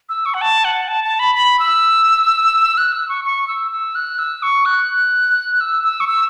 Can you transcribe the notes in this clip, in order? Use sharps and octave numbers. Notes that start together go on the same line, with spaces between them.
E6
C#6
F#5
A5
F#5
A5
A5
B5
B5
E6
F#6
E6
C#6
C#6
E6
E6
F#6
E6
C#6
F#6
E6
E6
C#6
E6